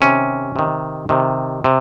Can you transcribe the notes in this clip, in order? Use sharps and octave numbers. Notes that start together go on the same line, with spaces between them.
C3 D#3 C#4
C3 D#3
C3 D#3
C3